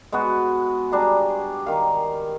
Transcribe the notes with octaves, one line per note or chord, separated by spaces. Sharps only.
G#3 B3 F#4
G3 D4 G#4 A#5
D#3 F5